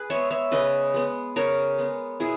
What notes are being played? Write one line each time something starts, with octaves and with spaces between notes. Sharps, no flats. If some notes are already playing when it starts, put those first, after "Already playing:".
Already playing: G#4 B4
G#3 B3 C#5 E5
C#5 E5
C#3 B4 D#5
G#3 B3
C#3 A#4 C#5
G#3 B3
B2 E4 G#4